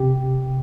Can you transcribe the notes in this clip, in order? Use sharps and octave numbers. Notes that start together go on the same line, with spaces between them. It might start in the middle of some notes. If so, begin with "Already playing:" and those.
Already playing: C3 G4